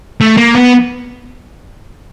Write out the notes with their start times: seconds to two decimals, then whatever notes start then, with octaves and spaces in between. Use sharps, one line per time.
0.21 A3
0.37 A#3
0.55 B3